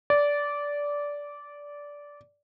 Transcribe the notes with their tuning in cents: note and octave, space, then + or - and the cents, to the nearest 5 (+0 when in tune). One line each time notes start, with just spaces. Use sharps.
D5 -15